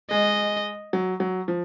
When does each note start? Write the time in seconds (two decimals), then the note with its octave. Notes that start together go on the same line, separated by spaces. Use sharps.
0.10 G#3 D#5
0.93 F#3
1.20 F#3
1.48 F3